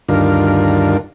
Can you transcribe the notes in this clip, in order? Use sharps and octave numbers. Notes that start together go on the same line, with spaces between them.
D2 G2 D#3 D4 F4 A#4